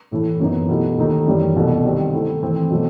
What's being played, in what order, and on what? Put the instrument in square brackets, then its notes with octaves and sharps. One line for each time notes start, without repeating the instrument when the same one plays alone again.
[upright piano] A2 E3 A3 E4 A4
F#2 E3 B3 D#4
B2 A3 E4 G4
D#2 D#3 A3 D#4
F#2 E3 G3
C2 B2 A3
D#3 G3 C4
D#3 A3 E4
E3 A3 C4
B2 F#3 A3